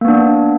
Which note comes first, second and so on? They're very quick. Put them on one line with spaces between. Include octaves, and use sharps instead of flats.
A#3 B3 D4